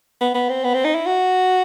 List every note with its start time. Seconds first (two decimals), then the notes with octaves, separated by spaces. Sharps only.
0.21 B3
0.35 B3
0.49 C4
0.64 B3
0.74 C4
0.85 D#4
0.95 E4
1.06 F#4